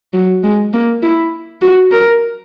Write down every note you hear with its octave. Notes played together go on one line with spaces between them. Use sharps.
F#3
G#3
A#3
E4
F#4
A#4